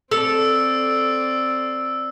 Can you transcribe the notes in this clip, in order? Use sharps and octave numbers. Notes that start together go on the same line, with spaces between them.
C4 A4 D5 E6